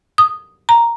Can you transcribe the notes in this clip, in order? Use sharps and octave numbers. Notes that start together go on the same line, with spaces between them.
D#6
A#5